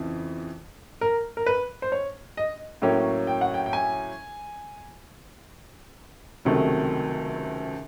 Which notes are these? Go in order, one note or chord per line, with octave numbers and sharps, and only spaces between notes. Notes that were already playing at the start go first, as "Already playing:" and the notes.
Already playing: F2 C#3 E3
A#4
A#4
B4
C5
C#5
D#5
A2 F#3 A#3 C#4 G5
G5
F#5
G5
G5
G#5
C#2 C3 D#3 F#3 A3